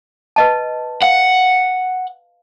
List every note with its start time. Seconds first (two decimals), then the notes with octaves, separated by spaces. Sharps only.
0.36 B4 D#5 A5
1.03 F5 F#5